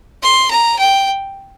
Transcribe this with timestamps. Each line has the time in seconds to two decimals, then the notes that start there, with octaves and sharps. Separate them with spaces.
0.22 C6
0.50 A#5
0.78 G5